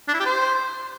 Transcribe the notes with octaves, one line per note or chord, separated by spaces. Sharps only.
D4
E4
G4
C5